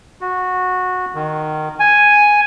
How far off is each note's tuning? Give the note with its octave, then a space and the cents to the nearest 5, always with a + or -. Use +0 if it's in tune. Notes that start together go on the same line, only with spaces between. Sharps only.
F#4 -15
D#3 -15
G#5 +0